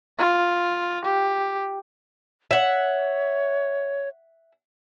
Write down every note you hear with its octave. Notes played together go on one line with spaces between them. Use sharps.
F4
G4
C#5 E5 F#5